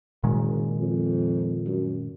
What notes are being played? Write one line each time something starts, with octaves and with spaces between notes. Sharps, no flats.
F#1 A#2 D#3 G#3
F2
F#2